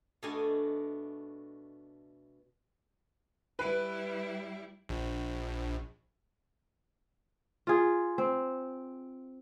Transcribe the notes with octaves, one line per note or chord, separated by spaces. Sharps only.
B2 A3 D4 D#5 G#5
G3 E4 B4
A#1
F4 G#4
C4